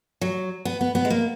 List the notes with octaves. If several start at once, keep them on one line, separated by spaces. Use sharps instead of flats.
F#3
B3
B3
B3
G#3
A#3